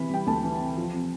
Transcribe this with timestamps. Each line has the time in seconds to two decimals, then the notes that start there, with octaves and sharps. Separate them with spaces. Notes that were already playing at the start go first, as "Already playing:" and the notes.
Already playing: C3 E3 B5
0.10 G3 G5
0.27 D2 A5
0.43 E3
0.60 C3
0.77 F3
0.93 C3